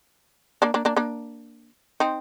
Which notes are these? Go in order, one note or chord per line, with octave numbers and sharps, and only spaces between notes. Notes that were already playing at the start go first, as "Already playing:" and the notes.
A#3 D4
A#3 D4
A#3 D4
A#3 D4
C4 D#4